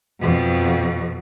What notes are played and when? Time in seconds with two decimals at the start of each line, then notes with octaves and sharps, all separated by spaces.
0.20 F2 B2